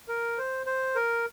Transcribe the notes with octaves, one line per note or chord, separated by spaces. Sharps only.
A#4
C5
C5
A#4